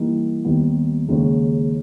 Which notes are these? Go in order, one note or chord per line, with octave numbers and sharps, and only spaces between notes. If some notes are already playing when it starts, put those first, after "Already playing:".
Already playing: E3 G3 A#3 D#4
D#2 D#3 G3 B3
D#2 C#3 G#3 C#4